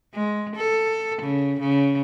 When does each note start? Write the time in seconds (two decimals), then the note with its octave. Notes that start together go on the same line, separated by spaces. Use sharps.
0.14 G#3
0.56 A4
1.22 C#3
1.60 C#3